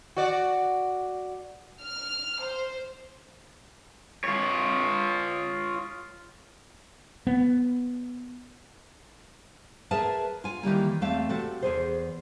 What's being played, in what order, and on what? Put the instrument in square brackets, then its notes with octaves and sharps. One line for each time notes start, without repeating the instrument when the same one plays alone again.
[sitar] F#4 D5
[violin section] F6
C5
[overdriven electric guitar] F4 C#5
[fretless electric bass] B3
[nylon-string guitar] G#4 A#4 B4 E5 A5
F4 G#5
D#3 E3 G3 A#3
E2 A3 C4 F5
C3 F#4 A4
E2 G#4 C5